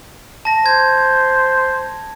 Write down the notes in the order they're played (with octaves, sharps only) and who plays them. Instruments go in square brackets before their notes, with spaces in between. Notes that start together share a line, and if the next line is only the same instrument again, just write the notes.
[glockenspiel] A5 A#6
[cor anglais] C5 [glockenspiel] G#6